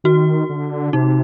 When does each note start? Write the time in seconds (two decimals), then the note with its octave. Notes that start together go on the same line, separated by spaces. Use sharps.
0.04 D#3 F#4
0.49 D3
0.93 C3 D#4